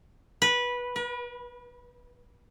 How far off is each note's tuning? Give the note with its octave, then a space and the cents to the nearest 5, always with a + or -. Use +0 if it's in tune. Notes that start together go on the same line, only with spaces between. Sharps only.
B4 -15
B4 -45